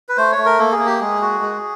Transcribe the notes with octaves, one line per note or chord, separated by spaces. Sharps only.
B4
A3 C5
C#5
A3
A#4
A#3 A4
G#4
A#3
G4
G#3 G#4
F#4
G#3